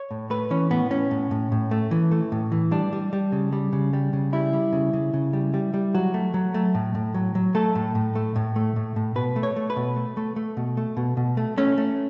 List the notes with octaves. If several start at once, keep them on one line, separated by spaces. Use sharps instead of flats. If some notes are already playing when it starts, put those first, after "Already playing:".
Already playing: C#5
A2
A3 B4
E3 C#4
A2 B3
A2 C#4
A2
A2
A2
A3
E3
A3
A2
E3
G3 D4
G3
G3
C#3
G3
C#3
G3
C#3
G3 E4
G3
C#3
C#3
C#3
G3
G3
G3
F#3 F#4
A3
F#3
A3
A2
A2
F#3
F#3
A3 A4
A2
A2
A3
A2
A3
A2
A2
B2 B4
A3
C#5
A3
B4
B2
A3
A3
A3
B2
A3
B2
B2
A3
A3 C#4
A3